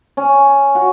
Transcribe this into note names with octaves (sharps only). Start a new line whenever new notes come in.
C#4
F#4